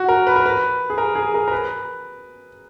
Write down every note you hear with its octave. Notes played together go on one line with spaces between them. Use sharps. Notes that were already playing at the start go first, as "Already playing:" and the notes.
Already playing: F#4
A#4
B4
A#4
B4
G#4
A#4
G#4
A#4
A#4
B4